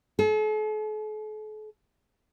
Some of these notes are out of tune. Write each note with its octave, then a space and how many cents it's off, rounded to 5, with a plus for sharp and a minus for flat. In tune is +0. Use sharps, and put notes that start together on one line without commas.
A4 -45